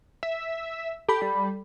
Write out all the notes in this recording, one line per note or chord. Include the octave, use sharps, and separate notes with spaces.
E5
G4 A4 B5
G3